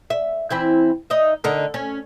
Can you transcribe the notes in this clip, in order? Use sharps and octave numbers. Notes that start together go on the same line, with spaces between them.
E5
E3 C4 E4
D#4 D#5 E5
D3 D#4 A#4
C#4